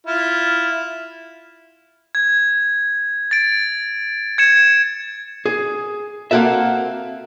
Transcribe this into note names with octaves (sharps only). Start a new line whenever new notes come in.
E4 F4
G#6
A6 D7
G#6 C#7 E7
G#4
A#3 C4 F#4 A4 E5